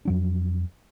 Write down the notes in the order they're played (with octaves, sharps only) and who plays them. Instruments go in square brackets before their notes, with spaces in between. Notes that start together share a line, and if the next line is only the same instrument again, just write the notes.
[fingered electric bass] F2 F#3 D4